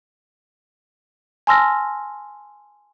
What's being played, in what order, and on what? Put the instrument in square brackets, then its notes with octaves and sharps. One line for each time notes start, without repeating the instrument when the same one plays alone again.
[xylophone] G#5 A5 C6 E6 F6 A#6